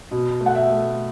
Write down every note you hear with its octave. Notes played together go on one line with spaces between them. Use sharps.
B2
A3
F#5
E5
A3